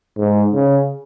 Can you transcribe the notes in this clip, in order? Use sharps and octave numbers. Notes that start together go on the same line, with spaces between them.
G#2
C#3